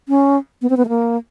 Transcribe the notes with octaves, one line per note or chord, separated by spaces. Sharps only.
C#4
B3
C4
B3
A3
A#3